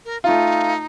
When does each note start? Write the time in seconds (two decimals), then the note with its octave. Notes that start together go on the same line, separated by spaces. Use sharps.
0.05 A#4
0.24 A3 D#4 F4